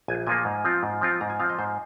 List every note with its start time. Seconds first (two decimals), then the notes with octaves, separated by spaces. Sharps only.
0.08 A#1 G#5
0.27 A#2 F3 A#3 G#5
0.45 G#2
0.65 F3 C4 F4
0.83 G#2
1.01 F3 C4 F4
1.21 G#2 A#5
1.30 G#5
1.40 F3 C4 F4 F5
1.50 D#5
1.59 G#2 C5